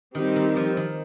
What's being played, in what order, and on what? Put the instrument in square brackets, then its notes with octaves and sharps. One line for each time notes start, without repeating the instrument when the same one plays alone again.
[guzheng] D#3 [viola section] G3 C4 D#4 G4
[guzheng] D#3
F3
D#3